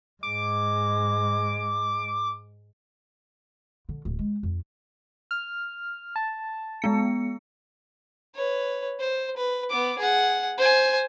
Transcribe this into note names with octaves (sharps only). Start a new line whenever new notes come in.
G#2 G#3 D6
D3
D1
G#3
F2
F6
A5
G#3 B3 C#7
B4 C#5
C5
B4
B3 D6
G#4 F#5
C5 G#5